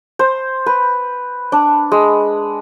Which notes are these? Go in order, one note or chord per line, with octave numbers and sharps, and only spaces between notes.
C5
B4
D4
G#3